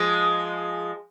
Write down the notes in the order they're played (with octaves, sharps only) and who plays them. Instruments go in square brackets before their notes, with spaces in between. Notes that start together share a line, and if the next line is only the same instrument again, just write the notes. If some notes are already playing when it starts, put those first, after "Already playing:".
Already playing: [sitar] F3 G#3